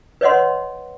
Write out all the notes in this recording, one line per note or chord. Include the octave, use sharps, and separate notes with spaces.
B4 C#5 D#5 F#5 C6